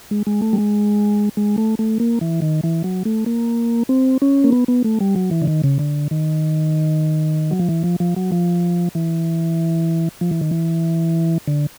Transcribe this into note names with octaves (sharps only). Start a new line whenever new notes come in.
G#3
G#3
A3
G3
G#3
G#3
A3
A3
A#3
E3
D#3
E3
F#3
A3
A#3
C4
C#4
A#3
B3
B3
A3
G3
F#3
E3
D3
D#3
C#3
D3
D#3
F#3
F3
E3
F3
F3
F#3
F3
E3
F3
E3
D#3
E3
D3